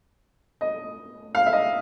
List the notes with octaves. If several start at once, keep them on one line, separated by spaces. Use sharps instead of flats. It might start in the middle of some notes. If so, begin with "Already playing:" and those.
D#5
F5
E5
D#5